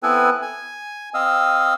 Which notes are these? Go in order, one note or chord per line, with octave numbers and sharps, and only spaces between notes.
B3 C4 E4 A4 B4 G#5
G#5
C4 D#5 F5 E6